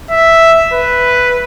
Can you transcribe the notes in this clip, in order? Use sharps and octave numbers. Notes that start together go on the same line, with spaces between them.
E5
B4